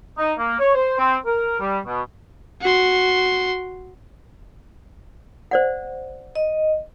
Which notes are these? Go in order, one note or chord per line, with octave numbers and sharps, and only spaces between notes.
D#4
A#3
C#5
C5
C4
A#4
G3
B2
F#4 C6
C5 D5 F#5
D#5